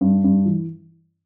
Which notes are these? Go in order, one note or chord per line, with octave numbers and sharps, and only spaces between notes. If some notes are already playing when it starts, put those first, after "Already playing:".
G2
G2
E3